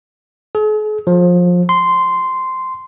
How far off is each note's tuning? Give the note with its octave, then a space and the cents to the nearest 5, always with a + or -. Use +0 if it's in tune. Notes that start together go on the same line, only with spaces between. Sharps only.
G#4 +45
F3 +25
C6 -10